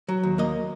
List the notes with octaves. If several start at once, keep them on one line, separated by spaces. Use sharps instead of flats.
F#3
D#2
A#3 D#5